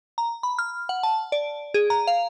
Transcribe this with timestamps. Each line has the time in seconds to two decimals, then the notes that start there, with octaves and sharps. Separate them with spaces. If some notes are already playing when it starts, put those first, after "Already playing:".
0.18 A#5
0.43 B5
0.59 F6
0.89 F#5
1.03 A5
1.32 D5
1.74 G#4
1.90 A#5
2.07 F5